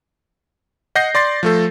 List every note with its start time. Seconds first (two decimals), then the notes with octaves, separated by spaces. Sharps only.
0.95 D#5 F#5 G6 A#6 C7
1.15 D5 C6 A6 C7
1.43 F3 A3 A4